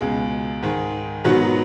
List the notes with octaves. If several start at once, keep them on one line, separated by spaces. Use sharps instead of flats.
C#2 B2 G#3
G#2 D#3 G#3
G#2 D#3 F#3 B3 F#4